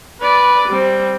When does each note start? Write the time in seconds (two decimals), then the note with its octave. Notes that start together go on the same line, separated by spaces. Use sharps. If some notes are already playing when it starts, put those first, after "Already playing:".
0.21 B4 D5
0.68 G3 C4